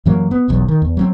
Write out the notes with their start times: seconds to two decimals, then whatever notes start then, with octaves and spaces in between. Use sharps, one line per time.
0.05 F#2 E3 F#3 A#3
0.31 B3
0.48 E1 B1 E2 F#3
0.68 D#3
0.82 E2
0.97 F#3 G#3 C4